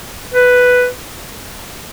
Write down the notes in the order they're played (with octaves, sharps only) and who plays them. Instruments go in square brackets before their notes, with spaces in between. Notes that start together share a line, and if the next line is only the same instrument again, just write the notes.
[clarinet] B4